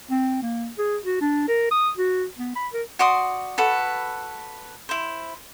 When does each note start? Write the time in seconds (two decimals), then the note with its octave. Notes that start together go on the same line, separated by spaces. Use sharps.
0.11 C4
0.42 A#3
0.78 G#4
1.04 F#4
1.21 D4
1.48 A#4
1.71 D#6
1.97 F#4
2.38 B3
2.56 B5
2.73 A#4
2.99 F#4 D5 C6 D#6
3.58 F#4 A4 B4
4.89 E4 C5